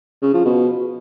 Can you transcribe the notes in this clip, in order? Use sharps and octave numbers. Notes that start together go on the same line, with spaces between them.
C#3
F3
B2